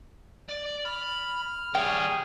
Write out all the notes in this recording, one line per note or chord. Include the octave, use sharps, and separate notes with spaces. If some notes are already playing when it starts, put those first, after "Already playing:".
D5
B5 F6
G3 G#4 C#5 G5